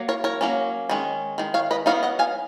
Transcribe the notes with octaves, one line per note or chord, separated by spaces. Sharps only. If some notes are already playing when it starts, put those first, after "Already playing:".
Already playing: F#3 A#3
A#4 C#5
A#4 C#5
F#3 A#3 C#4
D#3 G#3 C#4
D#3 G#3
C#5 F5
B4 D#5
F#3 B3 D#4 C#5 F5
D#5 F#5
F5 G#5